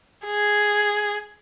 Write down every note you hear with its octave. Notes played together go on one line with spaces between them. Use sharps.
G#4